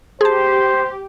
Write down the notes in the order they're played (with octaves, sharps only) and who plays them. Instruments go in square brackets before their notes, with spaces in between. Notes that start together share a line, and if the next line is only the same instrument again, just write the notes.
[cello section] G4 [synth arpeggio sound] G#4 A5 [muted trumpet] C5